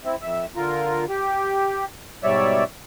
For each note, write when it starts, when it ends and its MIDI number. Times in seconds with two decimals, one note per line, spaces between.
0.05 0.16 60
0.05 0.16 64
0.22 0.46 41
0.22 0.46 76
0.56 1.05 50
0.56 1.05 65
0.56 1.05 70
1.09 1.85 67
2.24 2.64 44
2.24 2.64 47
2.24 2.64 55
2.24 2.64 73
2.24 2.64 74
2.24 2.64 76